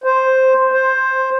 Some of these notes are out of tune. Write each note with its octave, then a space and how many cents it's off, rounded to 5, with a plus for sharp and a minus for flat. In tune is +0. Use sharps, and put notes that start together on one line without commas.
C5 +0
C5 +10